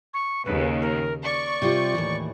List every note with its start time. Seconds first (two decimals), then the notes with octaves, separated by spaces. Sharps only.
0.14 C#6
0.45 D#2 C#3 B4
0.82 A#4
1.25 D5 C#6
1.62 C3 G3 F4
1.95 D#2 A2 E3